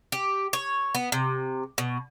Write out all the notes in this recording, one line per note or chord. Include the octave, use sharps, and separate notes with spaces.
G4
C#5
B3
C3
B2